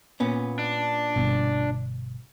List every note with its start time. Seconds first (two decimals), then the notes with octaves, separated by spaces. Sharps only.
0.20 A#2 B3 C#4
0.59 D4
1.16 G1 B2